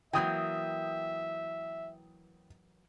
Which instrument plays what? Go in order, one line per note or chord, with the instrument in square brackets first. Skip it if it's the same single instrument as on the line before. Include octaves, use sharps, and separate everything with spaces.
[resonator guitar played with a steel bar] E3 F#3 A#3 [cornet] E5 [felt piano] G5 D#6 G6